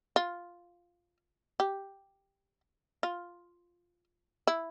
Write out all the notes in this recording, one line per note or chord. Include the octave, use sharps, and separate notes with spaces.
F4
G4
F4
E4